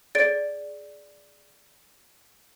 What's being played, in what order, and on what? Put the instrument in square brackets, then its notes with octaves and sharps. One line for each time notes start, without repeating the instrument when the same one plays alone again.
[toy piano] G#4 D5 [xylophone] A6 D7